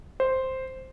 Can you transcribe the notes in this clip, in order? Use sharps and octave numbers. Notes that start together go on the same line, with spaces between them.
C5